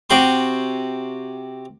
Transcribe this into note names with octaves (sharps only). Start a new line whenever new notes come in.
C3 F#4 G5 C6